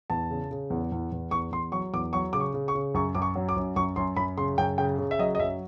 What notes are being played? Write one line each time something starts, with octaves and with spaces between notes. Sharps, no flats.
E2 A5
C#3
C#3
E2
E2
E2
E2 C#6
E2 C6
F#3 C#6
E2 D6
F#3 C#6
C#3 D6
C#6
C#3
C#6
C#3
F#2 C#6
F#2 D6
C#6
F#3
D6
F#2
F#2 C#6
F#2 C6
F#2 B5
C#3 C6
F#2 G5
C#3 G5
C#3
E5
F#3 D#5
D#5
F#2 E5